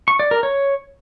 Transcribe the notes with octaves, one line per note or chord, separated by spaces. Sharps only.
C#6
D5
A#4
C#5